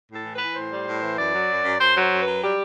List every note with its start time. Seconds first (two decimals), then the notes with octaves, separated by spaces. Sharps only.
0.09 A2 A4
0.25 E3
0.35 B4
0.40 E3
0.55 A2 C5
0.71 G3
0.87 A2
1.02 E3
1.17 F#2 D5
1.33 F#3
1.49 F#2
1.64 F#2
1.79 F#2 C5
1.96 F#3
2.01 C5
2.11 F#2
2.21 B4
2.27 F#3
2.42 G3 G4